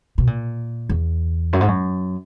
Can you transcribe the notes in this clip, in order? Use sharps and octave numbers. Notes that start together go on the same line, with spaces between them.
B2
A#2
E2
F#2
G#2
F#2